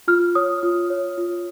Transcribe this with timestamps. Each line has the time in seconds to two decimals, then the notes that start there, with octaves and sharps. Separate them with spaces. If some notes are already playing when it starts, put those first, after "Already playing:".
0.08 F4 F6
0.35 C#5 D#6
0.63 F4
0.90 C#5
1.18 F4